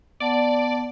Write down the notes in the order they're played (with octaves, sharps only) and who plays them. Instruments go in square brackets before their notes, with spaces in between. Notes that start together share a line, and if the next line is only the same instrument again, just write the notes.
[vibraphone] B3 F#5 A5 [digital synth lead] D5